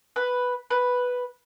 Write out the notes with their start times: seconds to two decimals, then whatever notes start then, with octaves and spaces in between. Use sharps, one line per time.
0.16 B4
0.70 B4